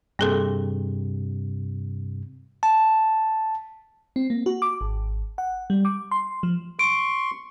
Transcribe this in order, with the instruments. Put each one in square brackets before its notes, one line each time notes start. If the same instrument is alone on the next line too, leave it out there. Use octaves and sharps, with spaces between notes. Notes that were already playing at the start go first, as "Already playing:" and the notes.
[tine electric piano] G2 C3 [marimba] A#3 G#4 A4
[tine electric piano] A5
[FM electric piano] C4
A#3
F#4
D6
G#1
F#5
G3
D6
C6
F3
[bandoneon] C6 C#6 [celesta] D7